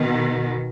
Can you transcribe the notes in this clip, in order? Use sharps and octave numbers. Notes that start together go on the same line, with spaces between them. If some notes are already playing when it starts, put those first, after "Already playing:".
Already playing: B2 D#3